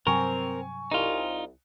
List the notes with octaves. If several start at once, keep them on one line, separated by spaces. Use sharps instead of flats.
G2 C3 F#3 C4 A#4 G#5 C#6
C2 D#4 F4